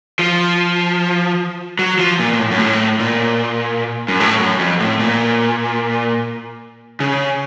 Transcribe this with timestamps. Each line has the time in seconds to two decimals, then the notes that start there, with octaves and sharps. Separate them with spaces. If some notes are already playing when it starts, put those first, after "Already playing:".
0.19 F3
1.79 F#3
1.99 F3
2.20 A#2
2.33 A#2
2.39 A2
2.51 F#2
2.60 A2
2.99 A#2
4.08 F#2
4.20 A2
4.39 F#2
4.59 F2
4.80 A2
4.99 A#2
7.00 C#3